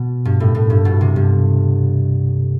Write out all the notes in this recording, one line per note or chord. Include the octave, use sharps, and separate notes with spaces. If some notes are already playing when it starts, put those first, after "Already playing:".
Already playing: B2
G2
A2
A2
G2
B2
C3
G2